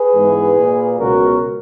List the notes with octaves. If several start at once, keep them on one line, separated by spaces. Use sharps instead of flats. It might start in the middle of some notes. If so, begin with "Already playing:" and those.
Already playing: G#4 B4
G#2 E3 G#3 B3
A#2 A#3
C#2 B2 F#3 B3 F#4 A#4